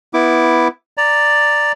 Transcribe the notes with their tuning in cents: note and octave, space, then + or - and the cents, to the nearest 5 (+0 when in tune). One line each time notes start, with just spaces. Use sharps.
B3 +0 E4 +0 D6 +0
D5 +0 A#5 -10